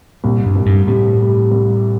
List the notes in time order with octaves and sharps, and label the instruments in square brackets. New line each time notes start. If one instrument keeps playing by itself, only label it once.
[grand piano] C2 [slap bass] A#2
[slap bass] G2
[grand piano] C2
[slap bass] G2
[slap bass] A2 [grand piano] C3
[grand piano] G3
C2